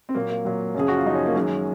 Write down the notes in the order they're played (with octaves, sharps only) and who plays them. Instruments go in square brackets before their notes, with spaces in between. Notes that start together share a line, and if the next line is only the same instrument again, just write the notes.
[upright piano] C4
A#2 F#3 A#3
A#3
A#2 F#3
F#2 C#3 F3 G#4
F#4
F4
F#2 C#3 F3 D#4
C#4
A#3
F#2 D#3 F#3 G#3